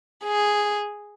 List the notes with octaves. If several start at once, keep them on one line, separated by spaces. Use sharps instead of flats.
G#4